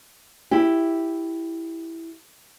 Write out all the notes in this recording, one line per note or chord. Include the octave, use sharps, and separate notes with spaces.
E4 G4